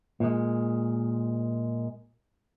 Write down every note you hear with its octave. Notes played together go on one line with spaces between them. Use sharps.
A#2 G#3